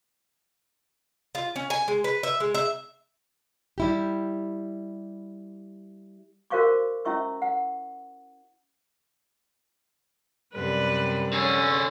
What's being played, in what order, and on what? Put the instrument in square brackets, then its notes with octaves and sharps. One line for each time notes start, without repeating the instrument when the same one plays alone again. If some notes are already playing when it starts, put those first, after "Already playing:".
[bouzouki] F4
C#4
G#5
G#3
B4
E5
G#3
E5
[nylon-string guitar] G3 E4 G4
[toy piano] F#4 A#4 C5 F5 C#6 D6
C#4 E4 E5 C#6 E6
F#5
[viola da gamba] F#2 C3 D5 [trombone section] G3 [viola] B4
[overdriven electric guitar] D3 G#4 [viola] C#4